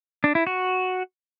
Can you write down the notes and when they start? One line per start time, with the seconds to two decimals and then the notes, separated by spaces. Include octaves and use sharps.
0.24 D4
0.35 E4
0.47 F#4